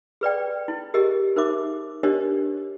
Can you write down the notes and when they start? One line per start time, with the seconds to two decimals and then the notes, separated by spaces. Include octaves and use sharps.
0.21 G#4 B4 D5 G5
0.68 E4
0.94 G4 G#4 A#4 D#5
1.36 D#4 A#4 C5 E5 D6
2.03 D4 G4 A#4 C5 C#5 D#5